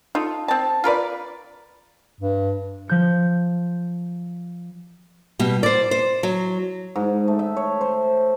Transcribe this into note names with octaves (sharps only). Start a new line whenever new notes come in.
D#4 F4 A4
C4 A5
F4 A#4 B4 D5
G2
F3 G6 C#7
B2 G3
C5 D5
C5
F#3
G#2
A3
E5
C#5
C5